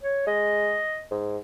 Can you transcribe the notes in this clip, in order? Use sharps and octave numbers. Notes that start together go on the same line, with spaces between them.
C#5
G#3 D#5
G#2